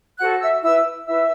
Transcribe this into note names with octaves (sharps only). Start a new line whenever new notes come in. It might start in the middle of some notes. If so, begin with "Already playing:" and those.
F#4 A4 C5 F#5 F#6
E5 E6
E4 B4 E5 E6
E4 B4 E5 E6